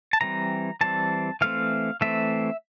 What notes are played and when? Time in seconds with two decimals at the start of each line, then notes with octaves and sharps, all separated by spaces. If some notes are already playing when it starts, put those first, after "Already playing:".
0.13 A5
0.21 E3 G3 C4 A#5
0.81 E3 G3 C4 A5
1.41 E3 A3 C4 F5
2.01 E3 A3 C4 E5